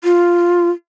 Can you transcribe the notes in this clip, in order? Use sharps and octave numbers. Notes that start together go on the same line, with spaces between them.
F4